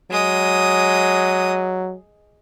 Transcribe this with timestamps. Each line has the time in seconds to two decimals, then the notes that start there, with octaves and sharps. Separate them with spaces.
0.11 F#3 G#3 D#6